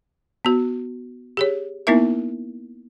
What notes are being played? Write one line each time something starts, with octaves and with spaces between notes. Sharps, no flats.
B3 F#4
G4 G#4 C#5
A#3 B3 D#4 E4 A#4 E5